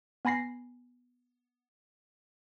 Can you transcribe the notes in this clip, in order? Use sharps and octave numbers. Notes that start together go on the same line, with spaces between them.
B3 G#5 B5 A#6 C7